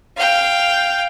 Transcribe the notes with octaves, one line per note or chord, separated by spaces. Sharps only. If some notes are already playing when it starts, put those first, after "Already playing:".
F5 G5